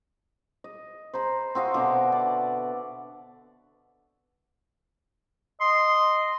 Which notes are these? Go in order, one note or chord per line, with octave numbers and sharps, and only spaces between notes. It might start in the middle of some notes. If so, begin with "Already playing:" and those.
D#5
C5 A#5 B5
C4 F#4 D#5 F5
B2 D3 E5 D6
D5
D#5 C6